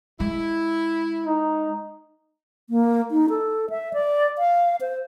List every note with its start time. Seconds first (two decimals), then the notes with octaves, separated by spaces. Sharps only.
0.20 G#3 E4
1.26 D#4
2.70 A#3
3.11 D#4
3.30 A4
3.70 E5
3.93 D5
4.38 F5
4.81 C5